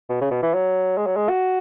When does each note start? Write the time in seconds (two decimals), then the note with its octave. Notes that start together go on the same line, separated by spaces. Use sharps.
0.09 B2
0.21 C#3
0.31 B2
0.43 E3
0.54 F#3
0.98 G#3
1.06 F#3
1.16 G#3
1.29 F#4